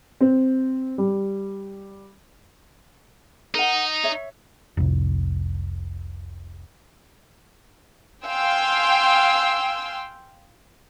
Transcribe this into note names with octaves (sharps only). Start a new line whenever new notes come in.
C4
G3
D#4 A#4 F#5
C#5 E5
F1 C2
F5 G5 G#5 C6 E6